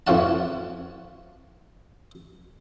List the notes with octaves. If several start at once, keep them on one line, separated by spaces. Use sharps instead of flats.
F2 E3 F3 C#5 F#5 A5